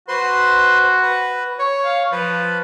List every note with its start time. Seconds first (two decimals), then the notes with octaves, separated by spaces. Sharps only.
0.08 F#4 B4 C5 C6
1.02 B4
1.59 C#5
1.85 F5
2.12 F3 B4